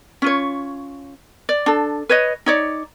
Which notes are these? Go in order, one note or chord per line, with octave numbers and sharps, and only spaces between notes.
C#4 F4 C#5
D5
D4 A4
B4 C#5 D#5
D#4 C#5 D5